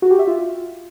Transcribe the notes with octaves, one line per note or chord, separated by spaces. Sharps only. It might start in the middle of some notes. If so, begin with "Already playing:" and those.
F#4
G4
E5
F4